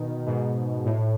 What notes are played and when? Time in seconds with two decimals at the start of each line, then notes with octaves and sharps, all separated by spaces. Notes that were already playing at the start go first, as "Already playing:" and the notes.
Already playing: B2 D#3
0.26 G#2 B2
0.85 A2